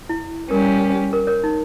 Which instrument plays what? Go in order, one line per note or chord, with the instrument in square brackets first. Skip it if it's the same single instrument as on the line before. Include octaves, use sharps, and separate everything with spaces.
[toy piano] E4
[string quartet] G3 C#4 G4 [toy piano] A#4
[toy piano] A#4
A#4 C#5
D#4